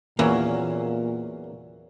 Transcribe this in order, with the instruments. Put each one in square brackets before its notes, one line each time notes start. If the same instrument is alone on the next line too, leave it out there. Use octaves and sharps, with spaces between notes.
[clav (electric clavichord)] E2 F#3 C#4 [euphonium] A#2 [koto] E3 [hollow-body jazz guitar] A#3